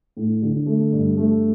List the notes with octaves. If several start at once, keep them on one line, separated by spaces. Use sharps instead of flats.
A2
D3
A3
G2
A3